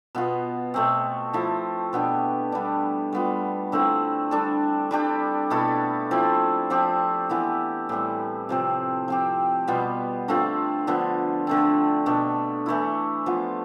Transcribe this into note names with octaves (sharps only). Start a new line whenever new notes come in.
B2 B3 F4
B2 A3 C4
F3 A3 E4
B2 B3 D4 G4
G3 B3 D4
G3 B3 F4
D3 A3 C4 E4
G3 D4 A4
G3 D4 G4
B2 A3 E4 A4
F3 C4 E4
F3 C4 G4
E3 B3 E4
A2 G3 C4
C3 F3 C4
F3 C4 G4
B2 G3 B3 F4
D3 A3 C4 F4
D3 F3 B3
D3 A3 C4
B2 A3 D4
E3 A3 E4
F3 B3 F4